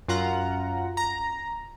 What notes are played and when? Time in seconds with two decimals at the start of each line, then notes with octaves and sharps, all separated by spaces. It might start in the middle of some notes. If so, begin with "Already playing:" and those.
0.08 F#2 F4 F#5 A#5
0.97 A#5